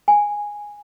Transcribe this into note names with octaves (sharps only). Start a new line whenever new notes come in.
G#5